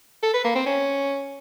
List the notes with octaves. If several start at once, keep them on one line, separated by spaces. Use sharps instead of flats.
A4
B4
A#3
C4
C#4